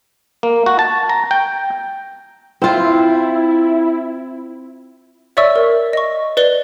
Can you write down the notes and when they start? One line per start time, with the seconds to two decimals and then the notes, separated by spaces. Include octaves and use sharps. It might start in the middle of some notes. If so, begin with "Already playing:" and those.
0.43 A#3
0.66 F#4
0.79 A5
1.09 A#5
1.31 G5
2.62 C4 E4 F4
5.37 C#5 D5 E5 C#6 E6
5.56 A#4
5.93 D#5 C#6
6.37 B4 D5 G7